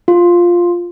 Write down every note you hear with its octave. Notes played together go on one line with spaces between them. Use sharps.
F4